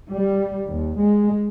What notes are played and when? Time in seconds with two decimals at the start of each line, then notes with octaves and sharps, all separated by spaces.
0.12 G3
0.68 D#2
0.99 G#3